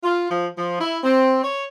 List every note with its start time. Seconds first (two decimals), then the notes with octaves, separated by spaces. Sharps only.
0.04 F4
0.30 F3
0.57 F3
0.80 E4
1.04 C4
1.44 C#5